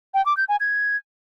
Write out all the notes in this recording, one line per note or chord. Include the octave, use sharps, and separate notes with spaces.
G5
D6
G6
G#5
G#6